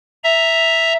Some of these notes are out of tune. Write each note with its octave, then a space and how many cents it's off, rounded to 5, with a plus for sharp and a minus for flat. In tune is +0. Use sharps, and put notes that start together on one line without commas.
E5 +0 A#5 +0